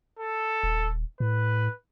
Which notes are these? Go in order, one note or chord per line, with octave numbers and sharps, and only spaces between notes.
A4
D#1
A2 B4